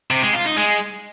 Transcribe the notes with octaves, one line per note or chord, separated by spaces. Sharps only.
C3
G#3
F4
D#4
G#3